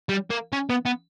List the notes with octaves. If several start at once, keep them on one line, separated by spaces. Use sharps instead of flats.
G3
A#3
C#4
B3
B3